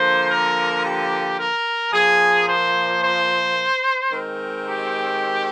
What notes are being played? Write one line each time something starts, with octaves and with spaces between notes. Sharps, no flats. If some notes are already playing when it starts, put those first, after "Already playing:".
Already playing: D3 F3 A#3 C5
A#4
G4
A#4
A#2 F3 A#3 G#4
C5
C5
D#3 G#3 C4 A#4
G4